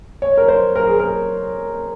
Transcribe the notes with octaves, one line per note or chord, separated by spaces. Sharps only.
C#5
A#4
C5
A#4
G#4
A#4